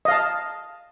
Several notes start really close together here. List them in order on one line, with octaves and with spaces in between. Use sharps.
D#5 F5 A5